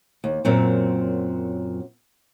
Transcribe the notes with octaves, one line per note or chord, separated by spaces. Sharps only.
D#2
F#2 A#2 F#3 C4